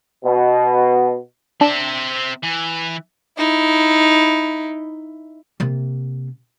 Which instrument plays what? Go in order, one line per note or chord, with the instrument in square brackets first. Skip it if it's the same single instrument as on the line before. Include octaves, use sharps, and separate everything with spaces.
[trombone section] B2
[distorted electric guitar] C4 E5 [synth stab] D4
[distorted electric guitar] E3
[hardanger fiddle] D#4 E4
[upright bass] C3 A#3